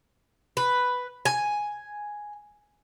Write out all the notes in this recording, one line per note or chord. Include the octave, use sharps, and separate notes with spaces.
B4
G#5